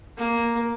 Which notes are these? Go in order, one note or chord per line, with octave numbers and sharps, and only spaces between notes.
A#3